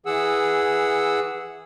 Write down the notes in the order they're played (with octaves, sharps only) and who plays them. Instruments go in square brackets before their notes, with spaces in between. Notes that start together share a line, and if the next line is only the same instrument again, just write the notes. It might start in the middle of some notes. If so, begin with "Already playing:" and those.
[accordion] E3 G#4 F#5 E6